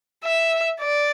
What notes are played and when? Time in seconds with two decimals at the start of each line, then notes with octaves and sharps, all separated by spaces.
0.25 E5
0.81 D5